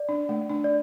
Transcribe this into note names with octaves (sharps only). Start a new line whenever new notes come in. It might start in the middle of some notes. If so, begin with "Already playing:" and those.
Already playing: D5
D4
A3
D4
D5